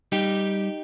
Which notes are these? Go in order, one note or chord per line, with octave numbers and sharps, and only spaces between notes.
G3 D#4 G4